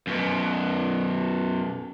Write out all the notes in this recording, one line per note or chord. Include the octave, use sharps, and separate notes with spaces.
F#2 B2